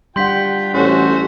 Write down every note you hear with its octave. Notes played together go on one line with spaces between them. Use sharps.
G3 D4 F4 F#5 G5 C6 G6 B6
A1 A3 C#4 F#4 C5